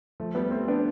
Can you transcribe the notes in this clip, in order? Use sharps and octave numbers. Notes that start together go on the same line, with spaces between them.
F3 A3
G3 B3
A3 C4
B3 D4